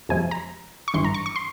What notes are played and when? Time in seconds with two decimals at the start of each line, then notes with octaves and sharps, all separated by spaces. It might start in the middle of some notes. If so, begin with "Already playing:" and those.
0.09 F2 C3 F3 G#3 G#5
0.31 A#5
0.88 C#6
0.94 G#1 G2 E3 C6
1.04 A#5
1.14 C#6
1.26 C#6
1.36 C6